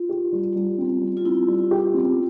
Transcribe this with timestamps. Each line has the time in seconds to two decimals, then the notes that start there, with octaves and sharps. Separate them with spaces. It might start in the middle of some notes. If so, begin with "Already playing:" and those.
Already playing: F4
0.09 G4
0.32 G3
0.56 G3
0.78 C4
1.01 G3
1.17 F4
1.25 C4 E4
1.48 G3
1.71 G4
1.94 C4